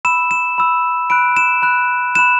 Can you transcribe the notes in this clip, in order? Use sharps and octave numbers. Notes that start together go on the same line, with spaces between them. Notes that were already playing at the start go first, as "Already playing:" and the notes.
B5 E6 E7
E7
B5 E6
B5 F#6 D7
E7
B5 F#6
B5 F#6 E7